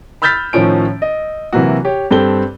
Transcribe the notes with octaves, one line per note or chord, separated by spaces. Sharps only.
B5 E6 F6 G6 A6 B6
A2 D#3 F3 C#4 D7
D#5
C3 E3 F#3 A#3 F#4
G4 C#5
G2 C4 G4 A4 G7